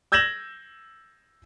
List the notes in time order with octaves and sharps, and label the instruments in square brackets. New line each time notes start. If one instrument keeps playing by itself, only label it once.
[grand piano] E6 G6 G#6 A#6 E7 F#7